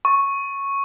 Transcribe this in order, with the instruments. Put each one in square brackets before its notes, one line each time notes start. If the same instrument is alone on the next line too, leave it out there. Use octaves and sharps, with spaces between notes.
[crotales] C#6